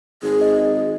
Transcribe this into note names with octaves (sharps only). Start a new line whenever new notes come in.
G#1 G#4
D#5